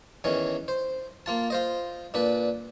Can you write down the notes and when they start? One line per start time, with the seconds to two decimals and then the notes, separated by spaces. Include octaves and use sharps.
0.24 E2 D#3 E3 C#4
0.68 C5
1.26 A#3 F4 A5
1.50 F4 C5 D#5
2.14 A#2 D4 B4